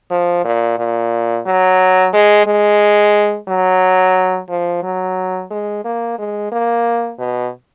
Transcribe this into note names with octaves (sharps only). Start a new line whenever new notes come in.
F3
A#2
A#2
F#3
G#3
G#3
F#3
F3
F#3
G#3
A#3
G#3
A#3
B2